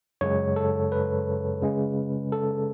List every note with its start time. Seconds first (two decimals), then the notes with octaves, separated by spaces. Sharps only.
0.21 F#2 C#3 G#3 C#5
0.56 A4
0.92 B4
1.62 C#3 G#3 C#4
2.32 A4